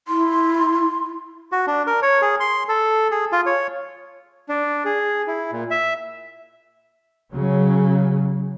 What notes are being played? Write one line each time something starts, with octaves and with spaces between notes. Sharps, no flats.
E4 C6
F#4
D4
A#4
C#5
G#4
C6
A4
G#4
F4
C#5
D4
G#4
E4
A#2
E5
C#3 F#3